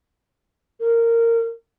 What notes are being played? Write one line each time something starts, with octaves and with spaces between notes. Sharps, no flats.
A#4